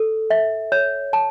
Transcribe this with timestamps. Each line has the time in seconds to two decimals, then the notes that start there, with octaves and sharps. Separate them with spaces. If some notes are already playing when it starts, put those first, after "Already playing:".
Already playing: A4
0.30 E5
0.72 C#5
1.13 A5